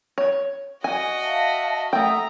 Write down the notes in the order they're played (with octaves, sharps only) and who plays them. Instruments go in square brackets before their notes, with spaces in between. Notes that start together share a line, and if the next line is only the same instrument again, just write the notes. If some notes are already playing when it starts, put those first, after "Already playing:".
[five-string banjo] C#5
[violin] F#4 D#5 [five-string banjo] G#5
[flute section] E5 F5 A5
[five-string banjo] A3 G5 [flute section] E5 F#5 D#6 [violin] A#5